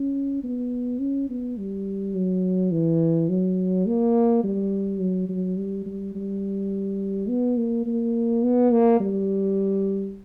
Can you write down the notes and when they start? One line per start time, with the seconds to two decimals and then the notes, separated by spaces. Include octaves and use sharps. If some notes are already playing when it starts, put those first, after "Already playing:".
Already playing: C#4
0.44 B3
1.01 C#4
1.30 B3
1.58 G3
2.15 F#3
2.72 E3
3.29 F#3
3.87 A#3
4.44 G3
5.00 F#3
5.29 F#3
5.57 G3
5.86 G3
6.15 G3
7.29 B3
7.57 A#3
7.86 A#3
8.43 B3
8.71 A#3
9.00 G3